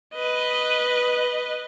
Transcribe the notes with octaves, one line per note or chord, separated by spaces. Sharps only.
B4 D#5